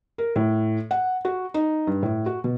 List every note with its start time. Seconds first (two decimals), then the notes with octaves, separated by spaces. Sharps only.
0.18 A#4
0.36 A2
0.91 F#5
1.25 F#4
1.54 D#4
1.87 G2
2.03 A2
2.26 F#4
2.44 B2